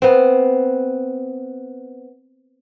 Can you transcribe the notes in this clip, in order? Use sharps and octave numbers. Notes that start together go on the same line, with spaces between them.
B3 C4